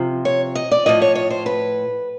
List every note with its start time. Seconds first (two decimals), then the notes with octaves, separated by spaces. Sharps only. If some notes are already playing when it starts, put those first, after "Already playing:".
Already playing: C3 F3
0.25 C#5
0.55 D#5
0.71 D5
0.86 A2 F3 D#5
1.02 C#5
1.15 C#5
1.30 C5
1.46 B4